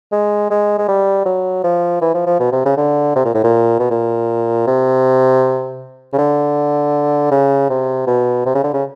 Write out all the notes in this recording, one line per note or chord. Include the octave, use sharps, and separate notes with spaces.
G#3
G#3
G#3
G3
F#3
F3
E3
F3
F3
B2
C3
C#3
D3
C3
A#2
A2
A#2
B2
A#2
C3
C#3
D3
C#3
C3
B2
C3
C#3
D3
C#3